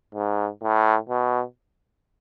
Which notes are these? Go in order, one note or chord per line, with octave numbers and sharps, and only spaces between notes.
G#2
A2
B2